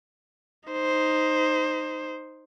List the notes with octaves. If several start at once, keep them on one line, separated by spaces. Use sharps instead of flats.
D#4 C5